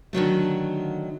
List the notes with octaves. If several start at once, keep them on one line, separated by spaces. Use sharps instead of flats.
D3 D#3 F#3 A3